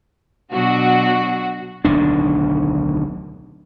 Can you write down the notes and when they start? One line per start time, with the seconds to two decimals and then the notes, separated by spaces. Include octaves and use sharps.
0.52 B2 F#3 D4 F#4
1.85 D1 B1 D#3 D4